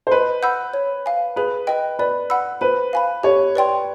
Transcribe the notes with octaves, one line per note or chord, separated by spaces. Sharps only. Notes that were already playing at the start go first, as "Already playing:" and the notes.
C5
B4 D#5
F#5 B5 E6 G6
C#5
F5 G#5
G#4 B4
B4 D#5 G5
B4 D5
F#5 B5 E6
B4 C5
F5 G#5 B5
G4 C#5
B4 D5 G5 C6